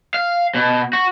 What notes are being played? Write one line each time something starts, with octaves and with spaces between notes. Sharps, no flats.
F5
B2
F#4